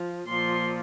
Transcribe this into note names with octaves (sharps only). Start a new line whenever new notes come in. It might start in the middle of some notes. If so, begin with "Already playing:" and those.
Already playing: F3
A#2 F3 C6